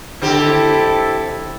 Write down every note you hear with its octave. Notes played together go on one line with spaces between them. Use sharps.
D3 C4 E4 G4 A4